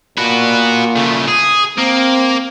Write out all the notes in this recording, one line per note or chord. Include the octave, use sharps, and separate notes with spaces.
A#2 F#4 B4
C#3 A3
G#4
A#3 C4